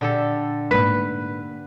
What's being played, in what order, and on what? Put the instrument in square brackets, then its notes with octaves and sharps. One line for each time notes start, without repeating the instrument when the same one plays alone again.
[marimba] A#2 [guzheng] D3 G4 A4
[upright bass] G#2 A#3 [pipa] B4